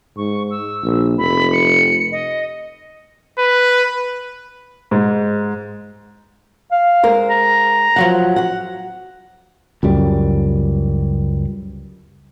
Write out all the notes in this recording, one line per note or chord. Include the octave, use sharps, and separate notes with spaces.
G#2 C#6
E6
A#1
F1 B5
C#7
D#5
B4
G#2
F5
G#3 A#4 C5
A#5
F3 F#3 F#5
F#4 F#5
C#2 F#2 G3